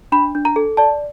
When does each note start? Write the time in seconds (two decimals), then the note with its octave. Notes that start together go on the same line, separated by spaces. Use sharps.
0.12 D4 B5
0.35 D4
0.45 A#5
0.56 A4
0.77 D5 A5